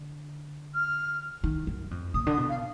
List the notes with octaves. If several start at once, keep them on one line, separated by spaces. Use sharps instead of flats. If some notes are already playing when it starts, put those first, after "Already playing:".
Already playing: D3
F6
D#3
F#2
F2
A#2 D#6
D3
D#6
B2
F5